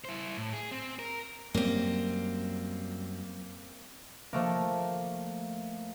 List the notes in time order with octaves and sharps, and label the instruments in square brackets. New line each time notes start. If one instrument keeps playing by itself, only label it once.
[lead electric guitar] E4 C5
A2
G#4
C4
A#4
[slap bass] F#2 G3 [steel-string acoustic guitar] A#3 C4
[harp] F3 A3 A#3